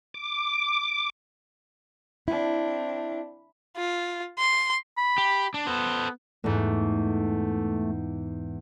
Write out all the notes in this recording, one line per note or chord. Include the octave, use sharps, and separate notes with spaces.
D6
C4 D4 E4
F4
C6
B5
G4
D4
B3 A4 C5
E2 G#2 A3